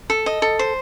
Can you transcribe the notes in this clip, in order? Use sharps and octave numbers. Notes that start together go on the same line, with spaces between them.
A4
D#5
A4
C5